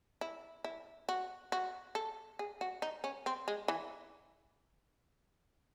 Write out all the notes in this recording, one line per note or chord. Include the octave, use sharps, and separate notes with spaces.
E4
E4
F#4
F#4
A4
G#4
F#4
D#4
C#4
C4
G#3
E3